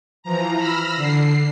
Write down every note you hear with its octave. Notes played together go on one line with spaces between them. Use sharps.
E3 F3 A#5
B5 E6 F6 A#6
D3 C7